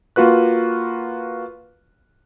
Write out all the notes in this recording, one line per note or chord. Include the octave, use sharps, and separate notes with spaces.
A#3 F4 F#4 B4 F#6